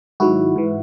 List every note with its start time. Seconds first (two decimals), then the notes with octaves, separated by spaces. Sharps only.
0.20 G#2 D#3 F#3 E4 F#4
0.56 G#2 E3